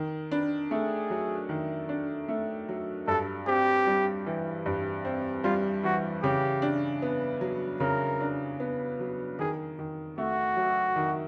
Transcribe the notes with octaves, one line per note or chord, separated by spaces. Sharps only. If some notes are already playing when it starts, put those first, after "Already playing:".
Already playing: D#3
D4 B4
A3 G#4
F#3
D#3
D4
A3
F#3
G2 A4
C4 G4
G3
E3
G2
C4
G3 F4
E3 F#4
C#3 G4
D4
B3
F#3
C#3 A#4
D4
B3
F#3
D#3 G#4
D#3
A3 F#4
F#3
D#3